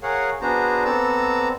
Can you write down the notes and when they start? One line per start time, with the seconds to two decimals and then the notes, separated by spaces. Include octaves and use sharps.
0.03 G#4 A#4 C#5 F5 F#5
0.41 B3 D4 F#4 G#4 C5 A#5
0.85 B3 C4 A4 D5 A#5 E6